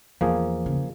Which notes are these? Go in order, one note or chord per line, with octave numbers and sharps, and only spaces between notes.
E2 F3 A#3 G#4
C#3